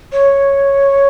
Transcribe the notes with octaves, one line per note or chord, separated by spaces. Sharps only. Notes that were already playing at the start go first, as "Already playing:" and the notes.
C#5